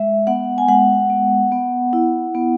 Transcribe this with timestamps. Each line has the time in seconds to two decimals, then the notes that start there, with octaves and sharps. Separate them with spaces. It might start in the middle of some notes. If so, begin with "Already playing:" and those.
Already playing: G#3 E5
0.27 B3 F#5
0.58 G#5
0.68 G#3 F#5
1.10 B3
1.52 B3
1.93 E4
2.35 B3